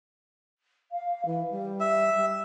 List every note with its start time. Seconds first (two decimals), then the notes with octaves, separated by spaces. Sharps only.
0.92 F5
1.26 E3
1.51 G3
1.80 E5
2.16 G3